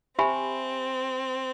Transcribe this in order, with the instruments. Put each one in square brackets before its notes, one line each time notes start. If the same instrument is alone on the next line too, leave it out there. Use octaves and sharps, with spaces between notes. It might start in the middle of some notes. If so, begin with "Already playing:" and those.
[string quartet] C4 [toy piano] G4 C5 E5 G#5 B5